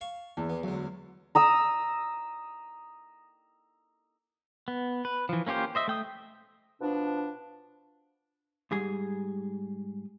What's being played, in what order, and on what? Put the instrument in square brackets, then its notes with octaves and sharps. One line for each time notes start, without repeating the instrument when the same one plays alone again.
[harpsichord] F5 A5 C#6
[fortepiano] E2 [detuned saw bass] E3
[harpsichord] B3
[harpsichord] D2 G#3 [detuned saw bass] F#3
[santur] A#5 D#6 E6
[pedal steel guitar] B3
B4
E3 F3
A#3 C#4 F4 G4 C5
C5 D#5 E5
A3 G5 D#6
[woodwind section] B2 F3 D4
[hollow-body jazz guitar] G#2 G3 G#4